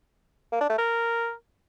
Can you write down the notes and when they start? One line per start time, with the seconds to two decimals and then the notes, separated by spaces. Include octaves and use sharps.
0.52 A#3
0.61 D4
0.69 A3
0.78 A#4